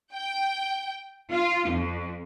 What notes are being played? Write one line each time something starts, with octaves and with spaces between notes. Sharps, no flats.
G5
F4
F2